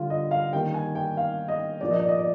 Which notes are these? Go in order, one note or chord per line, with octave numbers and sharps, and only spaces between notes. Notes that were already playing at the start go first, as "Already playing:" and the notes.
Already playing: D3 G3 F4
D#5
F5
D#3 G3 A#3 G5
G#5
G5
F5
D#5
A#2 F3 A#3 D5
D#5
D5
D#5
D5